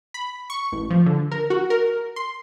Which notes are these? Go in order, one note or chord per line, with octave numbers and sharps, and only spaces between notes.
B5
C#6
A1
F3
D3
A#4
F#4
A#4
C6